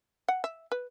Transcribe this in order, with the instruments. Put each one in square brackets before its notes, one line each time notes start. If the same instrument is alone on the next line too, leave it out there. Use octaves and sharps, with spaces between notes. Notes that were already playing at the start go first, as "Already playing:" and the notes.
[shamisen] F#5
E5
B4